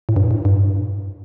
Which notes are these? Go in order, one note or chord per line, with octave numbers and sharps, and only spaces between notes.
A2
G2
A2
G2